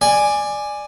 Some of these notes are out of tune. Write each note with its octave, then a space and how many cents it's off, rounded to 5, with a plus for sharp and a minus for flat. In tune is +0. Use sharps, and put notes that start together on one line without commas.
D5 +15 G#5 +0